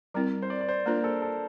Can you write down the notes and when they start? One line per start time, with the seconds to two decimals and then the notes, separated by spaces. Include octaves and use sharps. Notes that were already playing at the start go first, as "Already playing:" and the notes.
0.14 G3 C4 E4 A#4
0.42 C5
0.50 D5
0.61 D5
0.69 C5
0.86 A#3 D4 F4 A#4 C5
1.04 A4
1.22 A4